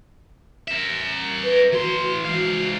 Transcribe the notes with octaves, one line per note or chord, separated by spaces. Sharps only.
A#4 E5
B4
E3 F#4 C6
G#2 F5